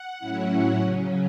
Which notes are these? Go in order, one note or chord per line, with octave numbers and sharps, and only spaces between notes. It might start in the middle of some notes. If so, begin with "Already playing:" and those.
Already playing: F#5
A2 F#3 C#4 E4
C#3 F#3 C#4